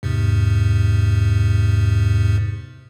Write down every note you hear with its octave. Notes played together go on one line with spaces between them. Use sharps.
E2 G#2 C3